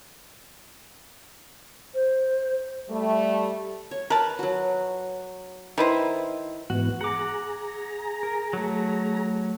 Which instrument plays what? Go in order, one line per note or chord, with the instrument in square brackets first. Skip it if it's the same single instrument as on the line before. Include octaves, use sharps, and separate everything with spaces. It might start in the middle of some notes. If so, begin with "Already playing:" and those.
[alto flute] C5
[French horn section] G3 A3
[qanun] C#5
[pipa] A#4 A5 [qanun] B4
[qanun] F#3 F#4
[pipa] D#3 B4 C5 [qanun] E4
[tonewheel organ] G#2 E3 B3 [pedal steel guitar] F#4
[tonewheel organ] G#4 A#5 [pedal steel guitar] F#5 D6
[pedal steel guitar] A#4
F#3 A3